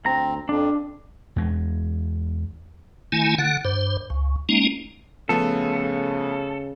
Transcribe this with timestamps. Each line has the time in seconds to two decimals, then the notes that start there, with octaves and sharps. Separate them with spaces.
0.05 D2 C4 A#5
0.49 F2 D4
1.36 E2 G#3
3.12 D#3 A3 E4 G#5
3.38 D3 F#5
3.65 G2 C5
4.10 C#2
4.49 G#3 A#3 C#4 D#4
5.29 C#3 F3 A3 B3 A4